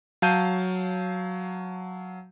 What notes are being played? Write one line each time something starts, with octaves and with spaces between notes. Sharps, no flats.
F#3 F5 A5 G6 D#7